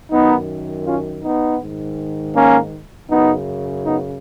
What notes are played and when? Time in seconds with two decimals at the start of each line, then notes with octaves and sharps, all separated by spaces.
0.11 F#2 D#3 B3 D#4
0.86 C#4 F4
1.23 B3 D#4
1.61 G#2 D#3
2.36 A#3 C#4
3.10 F#2 C#3 B3 D#4
3.86 B3 D#4